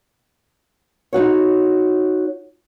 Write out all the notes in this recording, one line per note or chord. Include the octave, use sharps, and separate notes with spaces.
D#4 F#4 C#5